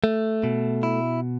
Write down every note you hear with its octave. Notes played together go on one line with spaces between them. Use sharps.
A3
B2
E4